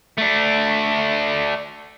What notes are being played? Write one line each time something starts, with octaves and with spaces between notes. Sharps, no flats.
A3 D4